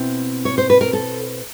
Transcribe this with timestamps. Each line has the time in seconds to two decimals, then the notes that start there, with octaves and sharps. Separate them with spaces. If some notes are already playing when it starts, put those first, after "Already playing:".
Already playing: B2 C4 E4
0.45 C#5
0.58 C5
0.70 B4
0.81 A#4
0.93 A4